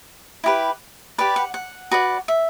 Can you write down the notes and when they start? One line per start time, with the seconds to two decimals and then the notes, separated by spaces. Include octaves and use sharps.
0.44 E4 G4 B4
1.18 G4 B4 D5
1.36 F#5
1.54 F#5
1.91 F#4 B4 D5
2.28 E5